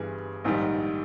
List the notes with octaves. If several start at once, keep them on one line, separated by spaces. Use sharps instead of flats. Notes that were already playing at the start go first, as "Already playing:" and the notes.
Already playing: G1 G2 E3 G3 G#4
A#1 G#2 D#3 G3